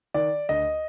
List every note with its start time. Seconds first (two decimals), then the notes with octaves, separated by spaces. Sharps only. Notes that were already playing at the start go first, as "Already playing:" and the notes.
0.14 D#3 D5
0.49 D2 D#5